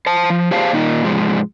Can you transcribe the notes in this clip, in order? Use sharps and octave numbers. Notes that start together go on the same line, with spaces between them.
C5 A5
F3
G4 G#4 C5 F5 A5
A#2 D#3 D#4
G#2 C3 F3 G#3